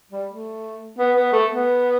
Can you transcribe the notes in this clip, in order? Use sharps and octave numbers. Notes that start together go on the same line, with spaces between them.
G3
A3
B3
B3
A3
B3